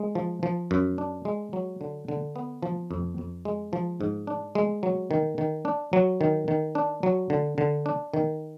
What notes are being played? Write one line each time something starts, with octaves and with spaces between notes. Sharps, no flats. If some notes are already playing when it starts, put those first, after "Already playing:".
Already playing: G#3
F3
F3
F#2
D4
G#3
F#3
D3
D3
B3
F3
F2
F2
G#3
F3
G#2
D4
G#3
F#3
D#3
D#3
D4
F#3
D#3
D#3
D4
F#3
D3
D3
D4
D#3